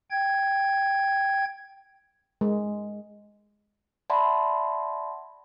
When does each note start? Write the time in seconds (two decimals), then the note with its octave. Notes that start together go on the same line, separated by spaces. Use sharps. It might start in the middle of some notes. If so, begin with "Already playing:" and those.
0.10 G5 G#6
2.41 G#3
4.10 D5 E5 F#5 A5 B5 C6